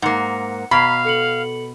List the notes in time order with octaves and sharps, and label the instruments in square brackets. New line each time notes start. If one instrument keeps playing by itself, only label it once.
[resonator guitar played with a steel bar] G#2 A#3 [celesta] F#5 C#7
[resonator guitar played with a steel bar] B2 [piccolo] F5 [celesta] A#5 B6 C7 [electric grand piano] B5
[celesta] A4 C#7 F#7